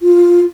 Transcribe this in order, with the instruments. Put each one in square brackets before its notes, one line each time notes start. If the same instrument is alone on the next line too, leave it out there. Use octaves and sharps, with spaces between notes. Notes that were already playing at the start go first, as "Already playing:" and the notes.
[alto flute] F4